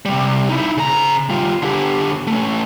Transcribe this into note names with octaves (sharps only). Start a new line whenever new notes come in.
C3 G3
D#4 E4
C#3 A#5
G3 F4
D3 G4
A3 C#4